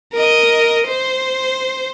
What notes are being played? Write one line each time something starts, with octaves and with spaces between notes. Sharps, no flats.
A#4 D#5
C5